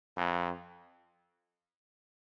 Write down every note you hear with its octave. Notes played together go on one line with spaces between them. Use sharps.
F2